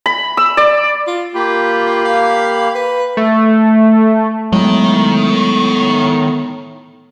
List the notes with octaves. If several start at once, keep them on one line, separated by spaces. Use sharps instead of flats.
B5
E6
D5
F4
A#3 F4 G4 B5
F5
B4
A3
A2 D#3 F#3 G#3 A3 B3